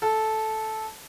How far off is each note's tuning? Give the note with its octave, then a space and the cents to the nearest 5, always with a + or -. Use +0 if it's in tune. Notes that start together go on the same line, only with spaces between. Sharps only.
A4 -10